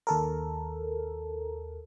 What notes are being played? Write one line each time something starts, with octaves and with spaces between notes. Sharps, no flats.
D#2 A4 A#4